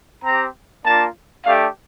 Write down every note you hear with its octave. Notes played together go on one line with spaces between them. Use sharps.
C4 G4 A#5
A#3 D4 F4 A5
A3 D4 G4 F5